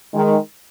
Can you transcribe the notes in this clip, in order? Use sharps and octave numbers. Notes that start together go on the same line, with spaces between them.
D#3 G#3